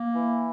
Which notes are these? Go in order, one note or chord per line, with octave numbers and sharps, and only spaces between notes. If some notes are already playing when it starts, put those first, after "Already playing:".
Already playing: A#3
E3